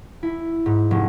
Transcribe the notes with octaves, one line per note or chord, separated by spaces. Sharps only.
E4
G#2
F1